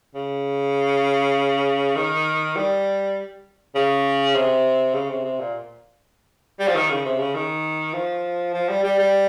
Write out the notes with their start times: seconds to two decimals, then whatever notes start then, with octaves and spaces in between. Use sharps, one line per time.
0.15 C#3
1.96 D#3
2.56 G3
3.75 C#3
4.35 C3
4.94 C#3
5.10 C3
5.25 C3
5.39 A#2
6.60 G3
6.68 F3
6.75 D#3
6.90 C#3
7.05 C3
7.19 C#3
7.35 D#3
7.94 F3
8.54 F3
8.69 G3
8.84 G3
8.99 G3